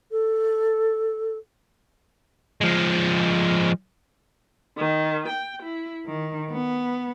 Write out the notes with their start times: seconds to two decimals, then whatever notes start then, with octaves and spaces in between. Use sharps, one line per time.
0.11 A4
2.61 F3 G#3
4.77 D#3
5.28 G5
5.62 E4
6.07 D#3
6.50 B3